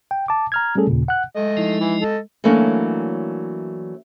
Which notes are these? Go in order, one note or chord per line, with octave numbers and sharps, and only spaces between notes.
G5
A5 D6
A#5 F6 G#6
G3 A3 C#4 G#4 A4
D#2 A#2 C#3
F#5 F#6
G#3 A3 D#5
F3 D#4 E4
E3
A4 D#5
E3 F#3 A3 A#3 C#4 D4